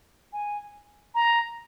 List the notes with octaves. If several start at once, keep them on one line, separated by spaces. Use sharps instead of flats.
G#5
A#5